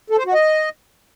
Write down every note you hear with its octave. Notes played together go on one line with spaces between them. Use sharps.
A4
C5
F#4
D#5